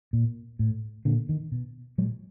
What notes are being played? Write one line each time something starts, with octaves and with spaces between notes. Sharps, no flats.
A#2
A2
A#2 D3
D#3
B2
A#2 F#3 G#3